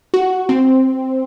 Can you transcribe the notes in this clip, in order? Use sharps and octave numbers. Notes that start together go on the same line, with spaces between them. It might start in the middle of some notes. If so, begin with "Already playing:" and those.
F#4
C4